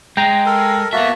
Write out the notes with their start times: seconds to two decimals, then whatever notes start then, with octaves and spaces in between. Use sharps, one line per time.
0.17 G#3 G5 A#5
0.46 A4 A#4
0.93 A#3 B3 F#4 E5 A5